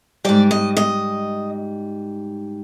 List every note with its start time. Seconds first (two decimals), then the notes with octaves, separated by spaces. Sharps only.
0.25 G#2 G3 D5
0.51 D#5
0.77 D#5